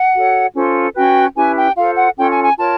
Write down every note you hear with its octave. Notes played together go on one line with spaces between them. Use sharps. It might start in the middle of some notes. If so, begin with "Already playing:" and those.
Already playing: F#5
F#4 A4 C#5
C#4 F4 A4 C5
C#4 F#4 B4 G5
C#4 E4 G4 B4 G#5
G5
F4 A4 C5 F5
F#5
C#4 F4 A4 C#5 G5
G#5
G#5
F4 A#4 C#5 A5